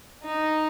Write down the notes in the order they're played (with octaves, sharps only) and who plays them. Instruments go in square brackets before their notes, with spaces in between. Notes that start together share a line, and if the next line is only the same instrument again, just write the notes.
[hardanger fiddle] D#4